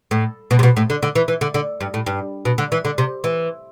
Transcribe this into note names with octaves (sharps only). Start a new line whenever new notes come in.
A2
B2
C3
B2
A2
D3
D3
E3
E3
D3
D3
G2
A2
G2
B2
D3
E3
D3
C3
E3